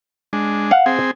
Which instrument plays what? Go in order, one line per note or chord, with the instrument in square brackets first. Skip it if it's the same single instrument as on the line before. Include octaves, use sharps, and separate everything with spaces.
[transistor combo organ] G#3 D4
[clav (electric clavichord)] F5 F#5
[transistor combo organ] C4 G#4